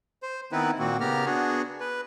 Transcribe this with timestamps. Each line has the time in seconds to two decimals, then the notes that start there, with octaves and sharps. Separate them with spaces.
0.23 C5
0.52 D#3 B3 C4 D#4 E4 B4
0.79 A#2 D#3 A#3 C4 F#4
1.00 C#3 B3 G4 A#4 F6
1.26 B3 D4 F#4 G#4
1.81 B4